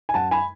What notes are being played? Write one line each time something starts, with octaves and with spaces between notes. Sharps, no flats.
G#5
F#2 F#5 A5
G#5 B5